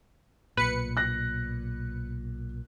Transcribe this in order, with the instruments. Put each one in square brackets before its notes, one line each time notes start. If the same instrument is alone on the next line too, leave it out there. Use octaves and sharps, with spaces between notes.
[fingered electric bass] B1 A#2 [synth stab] B4 C#7
[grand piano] F#6 A#6